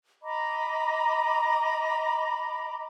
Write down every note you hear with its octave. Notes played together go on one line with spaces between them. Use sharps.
D#5 A#5 B5 D6